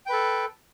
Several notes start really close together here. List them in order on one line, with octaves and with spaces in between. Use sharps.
G5 B4 A4